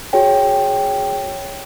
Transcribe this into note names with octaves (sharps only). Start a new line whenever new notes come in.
F#4 G#4 C#5 G5